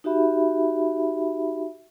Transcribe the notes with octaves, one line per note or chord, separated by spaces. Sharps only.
D#4 F#4 G4 E5 B5